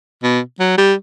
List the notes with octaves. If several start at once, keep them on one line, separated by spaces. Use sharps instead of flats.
B2
F#3
G3